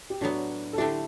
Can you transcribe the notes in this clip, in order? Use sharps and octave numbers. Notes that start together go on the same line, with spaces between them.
G4
A2 F#3 B3 D4 F#4
A4
D3 A3 D4 E4 G4